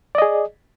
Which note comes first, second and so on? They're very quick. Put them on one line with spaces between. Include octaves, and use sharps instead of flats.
D5 D#5 G#4